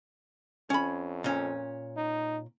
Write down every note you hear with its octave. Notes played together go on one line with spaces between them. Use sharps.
F2 C#4 B5
A#2 C#4
D#4